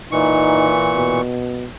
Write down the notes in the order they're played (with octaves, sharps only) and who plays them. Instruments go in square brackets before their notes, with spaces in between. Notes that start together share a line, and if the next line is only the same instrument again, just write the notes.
[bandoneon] A#2 E3 C#6 [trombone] D#4
[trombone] B2